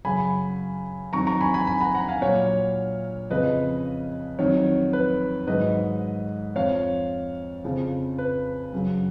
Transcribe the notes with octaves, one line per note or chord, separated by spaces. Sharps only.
F#2 C#3 F#3 G#5 B5
F2 D#3 F#3 A#5 C#6
A#5 C#6
G#5 B5
G#5 B5
G#5 B5
F#5 A#5
F#5 A#5
F5 G#5
A#2 F#3 C#5 F5
F2 C#3 F3 B4 D#5
F2 D#3 F#3 C#5
B4
G#2 D#3 F#3 B4 D#5
F2 F3 C#5 F5
F2 C#3 F3
B4
F#2 C#3 F#3